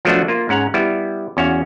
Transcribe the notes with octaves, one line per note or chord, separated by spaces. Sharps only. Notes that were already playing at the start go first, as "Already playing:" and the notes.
F3 F#3 A3 B3 D4 F#4
A#3 F4
G#2 C#4 F#5 A#5
G3 B3 E4
E2 C#4 F#4 F5